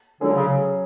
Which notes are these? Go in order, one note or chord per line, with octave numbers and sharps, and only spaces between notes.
D3 F#3 C#4 G#4
C#3